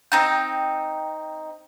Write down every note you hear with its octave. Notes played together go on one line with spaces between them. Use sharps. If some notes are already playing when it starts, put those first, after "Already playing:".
C4 D#4 G5